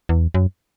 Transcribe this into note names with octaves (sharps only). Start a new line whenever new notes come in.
E2
F#2